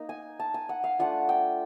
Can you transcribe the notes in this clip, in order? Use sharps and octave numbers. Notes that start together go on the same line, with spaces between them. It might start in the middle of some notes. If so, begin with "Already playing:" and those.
Already playing: A#3 D#4
G#5
A5
G#5
F#5
F5
A3 D4 F4 F#5
G5